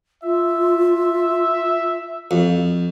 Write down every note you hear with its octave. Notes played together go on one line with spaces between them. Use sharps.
F4 E5
F2